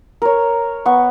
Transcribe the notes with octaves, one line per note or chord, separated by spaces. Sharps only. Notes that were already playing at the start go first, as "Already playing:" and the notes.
A#4 C#5
B3 C#6